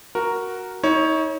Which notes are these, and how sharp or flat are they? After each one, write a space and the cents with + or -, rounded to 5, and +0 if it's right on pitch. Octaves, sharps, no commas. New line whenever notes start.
F#4 +0 A#4 +0
D#4 +35 C#5 +0